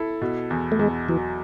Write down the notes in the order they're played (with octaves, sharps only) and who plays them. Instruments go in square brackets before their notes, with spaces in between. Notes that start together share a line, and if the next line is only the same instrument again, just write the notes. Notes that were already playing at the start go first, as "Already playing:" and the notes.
Already playing: [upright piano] E4 A4
B2
E2
[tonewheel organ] A3
[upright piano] E2 [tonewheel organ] G#3
[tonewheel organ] E3 [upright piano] F#3